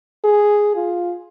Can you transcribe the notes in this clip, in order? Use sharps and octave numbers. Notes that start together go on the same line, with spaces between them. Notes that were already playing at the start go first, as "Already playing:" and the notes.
G#4
F4